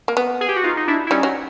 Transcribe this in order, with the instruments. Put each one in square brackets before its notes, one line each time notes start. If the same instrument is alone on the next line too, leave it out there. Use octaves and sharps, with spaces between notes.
[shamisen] A#3
B3
[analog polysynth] G#4
G4
F#4
D#4 F4
D#4
D4 E4
E4
[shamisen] G3 [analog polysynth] C#4 D#4
[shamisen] F#3